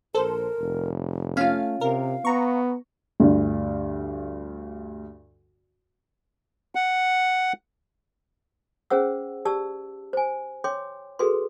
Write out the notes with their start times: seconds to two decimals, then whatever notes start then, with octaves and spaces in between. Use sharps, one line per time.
0.15 A#1 A4 A#4 C5
0.60 F1
1.37 A3 C#4 F4 F5
1.81 C3 A#4 F5
2.25 B3 A#5 C#6
3.20 D2 G2
6.75 F#5
8.90 C#4 G#4 C5 F#5 E6
9.45 G4 D5 A5 E6
10.13 C5 G#5
10.64 C#5 G5 C6 D6
11.19 F#4 G#4 A4 B4 C6